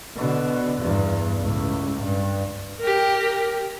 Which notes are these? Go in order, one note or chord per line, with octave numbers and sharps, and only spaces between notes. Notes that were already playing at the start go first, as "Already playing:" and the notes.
B2 D3
E2 G2
C#2 A2
G2
G4 A#4